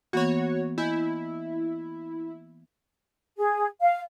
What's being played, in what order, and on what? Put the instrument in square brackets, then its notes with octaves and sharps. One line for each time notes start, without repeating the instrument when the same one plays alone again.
[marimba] E3 A#3 B3 [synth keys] F#4 C#5
[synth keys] E4 [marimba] D#5 G#5 G6
[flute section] G#4
F5